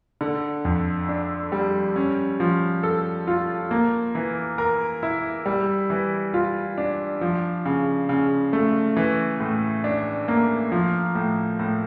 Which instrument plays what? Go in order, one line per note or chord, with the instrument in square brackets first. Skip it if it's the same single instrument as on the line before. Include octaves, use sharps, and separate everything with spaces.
[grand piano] D3
F2
D4
G3
C#4
F3
A4
F4
A#3
E3
A#4
E4
G3
E3
F4
D4
F3
C#3
C#3
A3
E3
A2
D4
A#3
F3
A2
A2